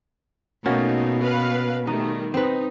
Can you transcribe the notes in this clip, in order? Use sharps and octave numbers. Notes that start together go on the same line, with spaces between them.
B2 A3 A#3 C#4 D#4 F#4 A6
B4 F5
D#3 G3 A3 D#4
C4 D#4 B4